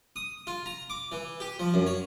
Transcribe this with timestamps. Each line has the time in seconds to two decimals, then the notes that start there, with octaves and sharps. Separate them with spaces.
0.16 D#6
0.47 F4
0.66 A#5
0.90 D6
1.12 E3
1.40 G4
1.59 F3
1.74 F#2
1.86 C#5